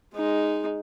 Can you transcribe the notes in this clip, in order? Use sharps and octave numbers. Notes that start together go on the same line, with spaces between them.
G#3 D#4